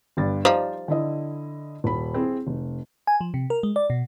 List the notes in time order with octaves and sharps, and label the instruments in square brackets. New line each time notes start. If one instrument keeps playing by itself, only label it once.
[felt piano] G1 G2 A6
[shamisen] F3 G3 D#4 [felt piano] C5 D5
[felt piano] D3 E4 D#5
D#1 B5
C4 E4 G#4
F1
[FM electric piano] G#5
F3
C3
A#4
G#3
D5
B2